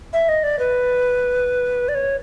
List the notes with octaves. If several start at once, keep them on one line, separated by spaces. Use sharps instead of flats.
E5
D#5
D5
B4
D5
C#5